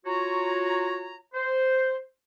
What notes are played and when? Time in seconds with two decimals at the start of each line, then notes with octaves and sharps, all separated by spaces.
0.06 F4 F#4 C#5 A#5
1.34 C5